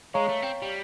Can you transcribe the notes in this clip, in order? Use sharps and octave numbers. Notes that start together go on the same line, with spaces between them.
G#3 C#5 F5 A#5 C#6
A3
C4
G3